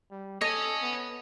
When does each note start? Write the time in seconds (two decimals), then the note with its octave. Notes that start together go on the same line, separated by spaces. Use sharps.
0.11 G3
0.41 A4 C#5 D#5 G#5
0.82 B3